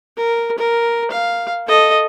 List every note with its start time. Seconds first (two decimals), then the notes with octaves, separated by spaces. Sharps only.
0.17 A#4
0.58 A#4
1.11 F5
1.68 A4 D#5